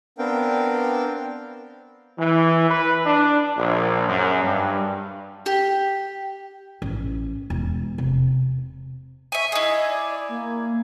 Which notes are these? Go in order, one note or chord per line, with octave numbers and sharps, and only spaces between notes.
B3 C4 D4 A#4 F5 G5
E3
B4
D4
A#1
F#2
G2
G4
A1
E1
C3
E5 G#5 C#6
E4 G#4 D#5
D5
A#3